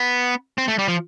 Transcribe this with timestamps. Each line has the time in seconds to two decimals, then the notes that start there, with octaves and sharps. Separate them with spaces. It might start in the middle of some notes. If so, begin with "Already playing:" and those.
Already playing: B3
0.58 C4
0.68 A3
0.79 G3
0.88 F3